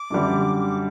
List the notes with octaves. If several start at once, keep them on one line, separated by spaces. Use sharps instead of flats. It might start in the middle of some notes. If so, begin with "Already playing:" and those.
Already playing: D6
F#2 D3 G3